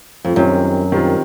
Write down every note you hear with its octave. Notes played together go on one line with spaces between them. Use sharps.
F2
F#2 D#3 G3 C4 F4
D#3 G3 C4 F4